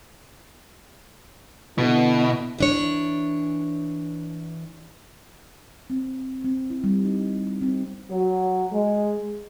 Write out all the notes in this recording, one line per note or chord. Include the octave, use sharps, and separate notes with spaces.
B2 D3 B3 E4
E3 D4 C#5
C4
C4
E4
G3
D#4
C4
F#3
G#3